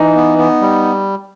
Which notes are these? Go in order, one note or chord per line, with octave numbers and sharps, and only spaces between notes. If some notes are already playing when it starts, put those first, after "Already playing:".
Already playing: E3 D#4
B3
B3
G3